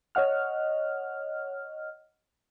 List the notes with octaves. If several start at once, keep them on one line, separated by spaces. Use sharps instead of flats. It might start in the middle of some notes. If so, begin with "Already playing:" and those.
C#5 D#5 F#5 F6